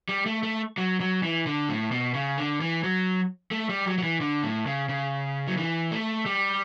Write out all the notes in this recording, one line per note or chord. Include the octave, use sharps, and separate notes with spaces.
G3
A3
A3
F#3
F#3
E3
D3
A2
B2
C#3
D3
E3
F#3
A3
G3
F#3
F#3
E3
D3
A2
C#3
C#3
F#3
E3
A3
G3